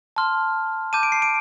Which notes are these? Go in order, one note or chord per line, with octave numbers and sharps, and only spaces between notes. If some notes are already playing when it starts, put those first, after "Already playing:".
A5 C6 F6
A5 D6 G6 D#7
D7
C7
D7